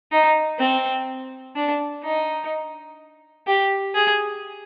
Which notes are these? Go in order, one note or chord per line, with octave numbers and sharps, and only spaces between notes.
D#4
C4
D4
D#4
G4
G#4